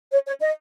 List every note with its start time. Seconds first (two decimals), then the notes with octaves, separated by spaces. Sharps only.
0.13 C#5
0.27 C#5
0.41 D#5